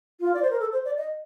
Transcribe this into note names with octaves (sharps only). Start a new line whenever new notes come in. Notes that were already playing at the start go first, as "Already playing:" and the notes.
F4
D5
C5
A#4
A4
C5
D5
D#5